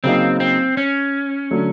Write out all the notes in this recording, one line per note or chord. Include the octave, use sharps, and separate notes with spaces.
C#3 F#3 A#3 C4 D#4
C4
C#4
D3 F#3 A3